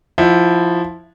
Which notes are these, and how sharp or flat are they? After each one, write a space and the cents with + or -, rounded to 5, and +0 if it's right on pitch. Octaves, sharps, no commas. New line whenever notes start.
F3 +0 E4 +0 F#5 -30